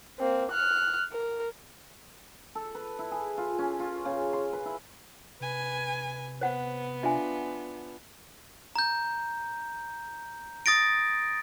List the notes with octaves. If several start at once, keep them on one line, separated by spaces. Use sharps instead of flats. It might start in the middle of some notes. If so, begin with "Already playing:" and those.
A#3 C4
F6 F#6
A#4
A4
B4
E4
G#4
F4
C#4
F4
C#3
C6
B4
E4
C3 B4 G#5
B3 C5 F#5
D4 F4 E5 G#5
A#5 G6
D#6 A6 A#6 D7